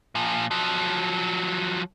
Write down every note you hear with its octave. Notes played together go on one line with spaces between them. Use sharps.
A#2 F3
F3 F#3